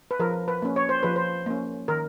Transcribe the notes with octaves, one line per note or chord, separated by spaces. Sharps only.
B4
F3 A#4
B4
A#3 C#4
C#5
C5
F3 B4
C5
A#3 C#4
D#3 A#4